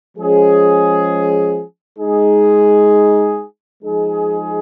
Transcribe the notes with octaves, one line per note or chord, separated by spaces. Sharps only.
F3 G#3 C#4 G#4
G#3 D#4 G#4
F3 G#3 D#4 G#4